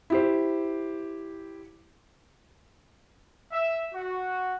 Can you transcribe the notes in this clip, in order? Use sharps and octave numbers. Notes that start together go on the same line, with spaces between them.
E4 G4 C5
E5
F#4